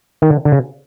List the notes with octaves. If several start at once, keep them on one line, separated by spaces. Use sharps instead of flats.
D#3
D3
D3
C#3